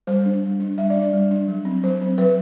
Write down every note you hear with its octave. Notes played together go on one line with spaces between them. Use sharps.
G3 C5
D4
G3
D4
G3 E5
D5
D4
D5
G3
D4
F#3
C4
F#3 C5
C4
F#3 B4